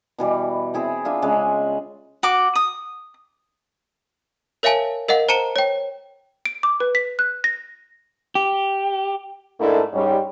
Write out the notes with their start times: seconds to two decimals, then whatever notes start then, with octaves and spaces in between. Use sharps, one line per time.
0.18 B2 E3 G3
0.74 C4 E4 G#4
1.05 D4 F4 E5
1.22 C#3 G#3
2.23 F#4 D6
2.55 D#6
4.63 A#4 C#5 E5 F5 G#5 A5
5.08 A#4 D#5 F5 F#5
5.29 C5 A5 A#5 C#7 E7 G7
5.56 C#5 G5
6.46 D7
6.63 D6
6.80 B4
6.95 B6
7.19 F#6
7.44 A#6
8.35 G4
9.59 G#2 A3 D4 E4 A4 A#4
9.93 G#2 G3 C#4